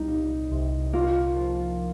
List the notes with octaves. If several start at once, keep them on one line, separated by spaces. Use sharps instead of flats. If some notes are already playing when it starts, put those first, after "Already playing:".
Already playing: C2 G3 D#4
A#2
C2
A#3 F4
F3